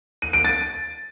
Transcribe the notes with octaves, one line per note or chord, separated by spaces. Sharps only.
D#7
D7
A6